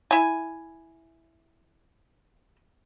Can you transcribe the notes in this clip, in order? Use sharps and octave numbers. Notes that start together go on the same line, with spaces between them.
E4 G#5